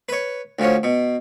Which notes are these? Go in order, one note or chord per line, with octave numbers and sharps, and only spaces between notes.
B4 C#5
D2 F3 C#4
B2